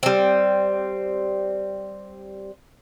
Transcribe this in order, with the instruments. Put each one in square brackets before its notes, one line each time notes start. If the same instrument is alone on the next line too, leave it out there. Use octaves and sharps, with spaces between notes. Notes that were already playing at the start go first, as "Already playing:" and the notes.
[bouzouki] G3 C4